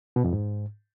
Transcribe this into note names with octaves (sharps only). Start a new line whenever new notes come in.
B2
F2
G#2